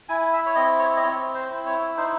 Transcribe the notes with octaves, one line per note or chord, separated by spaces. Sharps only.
E4 G#5
E5
C#5
C4 D#5
C#5
D#5
C4 C#5
C5
E4
C#5
D#4 C5